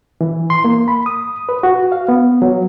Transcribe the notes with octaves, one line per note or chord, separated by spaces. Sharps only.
E3
C6
A#3
B5
D#6
B4
F#4
F5
B3
F#3